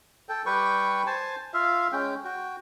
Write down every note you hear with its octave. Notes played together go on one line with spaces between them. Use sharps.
A4 G5
G3 B4 G5 C#6
C5 G#5 A5
F4 E5 F5
G#3 C#4 G5
F#4 G5